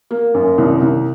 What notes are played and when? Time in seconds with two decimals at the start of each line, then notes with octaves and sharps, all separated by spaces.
0.11 A#3
0.34 F#2
0.58 C2
0.81 C2